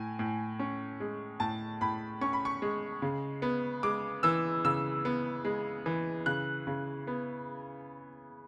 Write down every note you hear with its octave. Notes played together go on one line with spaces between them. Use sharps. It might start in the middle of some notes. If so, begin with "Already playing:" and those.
Already playing: A2 G#5
A2
C#4
G#3
A2 A5
A2 B5
C#4 C#6
B5
C#6
G#3
C#3
B3
G#3 D6
E3 E6
C#3 E6
B3
G#3
E3
C#3 F#6
C#3
B3